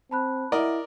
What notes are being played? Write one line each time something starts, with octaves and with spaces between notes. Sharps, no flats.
C4 A5 B5 F#6
E4 A#4 D5 D#5 F#5